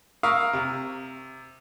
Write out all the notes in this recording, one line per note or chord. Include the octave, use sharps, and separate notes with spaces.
A#4 E5 F5 C#6 D#6 E6
C3